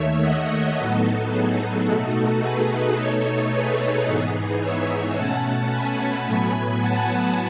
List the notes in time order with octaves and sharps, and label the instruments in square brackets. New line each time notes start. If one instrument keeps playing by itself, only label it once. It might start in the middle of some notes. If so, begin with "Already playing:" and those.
Already playing: [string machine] D#2 D#3 A3 C#5 E5
D#5 F#5
A2 F#3 B3 D#4 F#4 A4
G#4
B2 A3 D#4 F#4 A4
G#4 B4
B2 A3 D#4 A4 C#5
G#4 B4
G#2 E3 B3 D#4 G#4
C#5 E5
B2 A3 C#4 F#5 A5
G#5 B5
A2 F#3 B3
F#5 A5